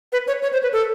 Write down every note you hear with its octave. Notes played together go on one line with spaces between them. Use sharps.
B4
C#5
C#5
C5
B4
A4